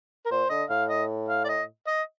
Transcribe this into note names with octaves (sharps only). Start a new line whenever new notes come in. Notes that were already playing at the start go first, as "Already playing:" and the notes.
A#4
A#2 C5
D3 D#5
A2 F5
D#5
F5
D5
D#5
D#5